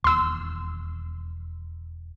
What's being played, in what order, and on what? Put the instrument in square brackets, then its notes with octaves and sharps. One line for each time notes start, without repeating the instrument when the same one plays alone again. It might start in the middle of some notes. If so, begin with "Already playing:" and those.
[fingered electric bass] E1 D#2 [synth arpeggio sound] C6 E6